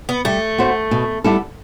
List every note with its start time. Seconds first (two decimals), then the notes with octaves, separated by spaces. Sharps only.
0.09 B3
0.25 G3 A3
0.58 B3 F#4 C5
0.91 B2
1.24 G3 B3 E4 A4